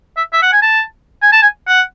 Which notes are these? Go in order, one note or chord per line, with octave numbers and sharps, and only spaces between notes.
E5
E5
F#5
G#5
A5
G#5
A5
G#5
F#5